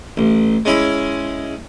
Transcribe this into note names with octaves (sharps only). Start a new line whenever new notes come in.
A1
G#3 C#4 E4